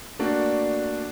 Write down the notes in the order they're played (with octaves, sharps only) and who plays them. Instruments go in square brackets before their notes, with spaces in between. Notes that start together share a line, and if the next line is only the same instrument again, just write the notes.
[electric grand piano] A3 A#3 D4 F#4 D5